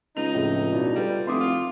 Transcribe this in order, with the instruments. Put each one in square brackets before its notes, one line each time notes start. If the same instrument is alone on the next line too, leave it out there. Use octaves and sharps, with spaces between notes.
[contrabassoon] C#2 [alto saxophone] D#4 [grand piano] F7
[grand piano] F2 A2 C#3
B2 D4 E4
[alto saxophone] G3 [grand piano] F4 A4 B4
[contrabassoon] F1 [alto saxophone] E4 [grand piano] C6 D6 D#6
[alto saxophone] F4